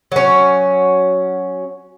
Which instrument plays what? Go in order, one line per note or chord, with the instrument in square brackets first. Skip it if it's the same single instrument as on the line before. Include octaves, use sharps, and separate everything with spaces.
[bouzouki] F#3 C#4